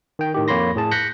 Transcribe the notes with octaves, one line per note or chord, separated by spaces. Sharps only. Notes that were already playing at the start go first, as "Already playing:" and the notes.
D#3 G5
A2 D#3 G4
F2 A#3 C#5 B5 C6 A#6
A2 G#4 A5
F#6 G6 A#6 B6 C#7